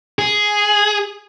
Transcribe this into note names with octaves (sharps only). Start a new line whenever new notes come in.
G#4